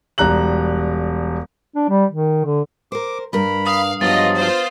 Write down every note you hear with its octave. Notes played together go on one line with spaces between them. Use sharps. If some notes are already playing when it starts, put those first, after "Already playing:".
E1 G3 A#5 F#6 F#7
D4
G3
D#3
D3
A#4 C5 D6
G2 A#4 B5
F5 D#6
G2 F3 F#3 B3 F4 D#5 A6
F4 C5